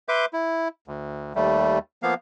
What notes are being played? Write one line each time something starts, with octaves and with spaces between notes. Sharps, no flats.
B4 E5 C6 D6 G6
E4
D2
D#2 G3 A3
F3 A#3 B3 F5